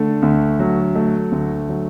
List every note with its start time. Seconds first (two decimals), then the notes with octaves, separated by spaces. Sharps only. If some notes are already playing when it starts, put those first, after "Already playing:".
Already playing: D3 A3
0.22 D2
0.59 F#3
0.95 A3
1.32 D2
1.69 F#3